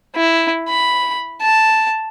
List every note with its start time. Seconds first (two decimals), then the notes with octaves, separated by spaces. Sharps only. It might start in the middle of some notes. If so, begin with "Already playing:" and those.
0.16 E4
0.69 B5
1.42 A5